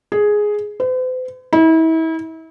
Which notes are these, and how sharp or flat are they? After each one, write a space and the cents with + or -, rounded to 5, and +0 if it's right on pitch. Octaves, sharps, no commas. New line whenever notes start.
G#4 +5
C5 -45
E4 -35